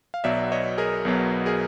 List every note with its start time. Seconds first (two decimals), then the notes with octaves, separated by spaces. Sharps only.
0.14 F5
0.24 B1 B2 F#3 B3 D5 E5
0.52 C#5 D#5
0.78 G#4 A#4
1.05 B1 B2 F#3 B3
1.46 G#4 A#4